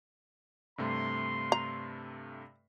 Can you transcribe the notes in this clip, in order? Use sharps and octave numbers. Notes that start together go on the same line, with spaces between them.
G2 C3 A3 C6
A#5